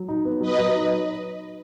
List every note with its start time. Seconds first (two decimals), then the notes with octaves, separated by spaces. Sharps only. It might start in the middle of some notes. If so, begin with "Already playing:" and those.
Already playing: F#3
0.09 D#4
0.25 B3
0.41 F#3 B4 D#5
0.58 F#3
0.74 D#4